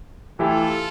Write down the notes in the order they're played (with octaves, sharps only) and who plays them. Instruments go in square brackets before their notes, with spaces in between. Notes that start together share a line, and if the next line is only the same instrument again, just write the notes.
[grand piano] E3 A3 E4 G4 [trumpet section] F4 A4